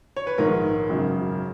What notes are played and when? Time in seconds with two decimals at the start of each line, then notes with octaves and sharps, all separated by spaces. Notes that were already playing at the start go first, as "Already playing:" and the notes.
0.16 C#5
0.27 B4
0.38 A#1 G#2 D#3 A#4
0.89 G#1 F#2 C#3